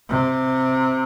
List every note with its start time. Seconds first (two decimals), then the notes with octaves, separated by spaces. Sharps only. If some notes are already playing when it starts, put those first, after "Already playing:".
0.09 C3